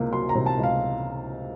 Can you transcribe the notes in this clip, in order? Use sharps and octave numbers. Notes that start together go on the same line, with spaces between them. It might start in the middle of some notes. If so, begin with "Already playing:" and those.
Already playing: C#2 C3 A#3
F#3 C6
A#5
C3
A5
C#2
F5